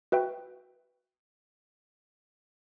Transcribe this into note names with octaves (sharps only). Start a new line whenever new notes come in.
F#4 B4 E5 G5